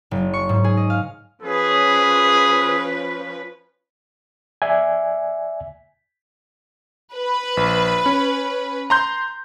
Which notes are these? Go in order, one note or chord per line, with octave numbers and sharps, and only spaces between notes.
F#1
C#6
G#2
G#4
D#5
F5
F3 C#4 G#4 B4
D5 E5 G#5
B4
A#1
C#4
A#5 C6 G6